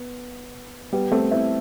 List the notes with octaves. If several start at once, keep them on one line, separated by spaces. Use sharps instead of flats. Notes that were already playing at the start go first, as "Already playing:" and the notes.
Already playing: B3
G3 B3
A3 C4
C4 E4